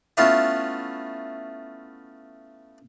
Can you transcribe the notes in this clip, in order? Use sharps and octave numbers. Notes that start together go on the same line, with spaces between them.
A3 B3 C#4 E4 F4